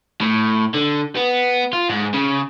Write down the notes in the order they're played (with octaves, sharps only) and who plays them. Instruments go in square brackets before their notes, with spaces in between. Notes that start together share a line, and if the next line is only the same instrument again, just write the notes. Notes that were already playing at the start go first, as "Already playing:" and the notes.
[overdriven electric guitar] A2
D3
B3
F4
G#2
C#3